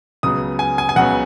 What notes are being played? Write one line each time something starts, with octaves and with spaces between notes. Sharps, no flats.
C#2 C#3 F#3 B3 D#6
G#5
G#5
G#5
C#2 C#3 F#3 B3 F#5